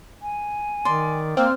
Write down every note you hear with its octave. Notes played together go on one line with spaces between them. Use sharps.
G#5
D#3 D5 C6
A#3 C4 F6